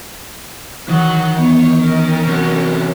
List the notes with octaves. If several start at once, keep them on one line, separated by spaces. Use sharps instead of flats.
D#3 E3 F#3
B3 C#5
C#4 A#4
C3 F#3